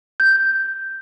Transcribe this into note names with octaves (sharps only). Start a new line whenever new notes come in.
G6